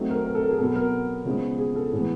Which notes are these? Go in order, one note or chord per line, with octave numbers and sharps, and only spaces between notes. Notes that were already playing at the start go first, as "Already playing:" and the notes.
Already playing: F#3 A3 C4 D#4
A#4
A#4
A4
A#4
G#4
B2 F#3 B3 A4
A#4
C#3 F3 G#3 B3 D#4
G#4
A4
A2 E3 G#3 B3